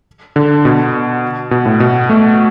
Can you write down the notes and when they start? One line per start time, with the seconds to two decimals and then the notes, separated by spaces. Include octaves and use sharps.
0.36 D3
0.65 B2
1.51 B2
1.66 A2
1.80 B2
2.10 A3